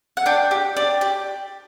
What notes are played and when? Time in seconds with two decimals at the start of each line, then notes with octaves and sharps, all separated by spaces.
0.17 F#5
0.26 D4 G5
0.51 G4
0.77 D4
1.01 G4